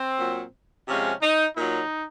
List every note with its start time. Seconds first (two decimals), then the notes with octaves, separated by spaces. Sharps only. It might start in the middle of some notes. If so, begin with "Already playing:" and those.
Already playing: C4
0.19 A#2 F#3
0.87 C3 F3 G#3 C#4
1.22 D#4
1.56 A#2 F#3 D#4